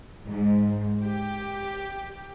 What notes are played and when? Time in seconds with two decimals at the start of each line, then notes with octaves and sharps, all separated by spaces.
0.24 G#2
1.03 G4